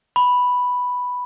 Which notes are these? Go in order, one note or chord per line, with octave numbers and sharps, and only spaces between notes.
B5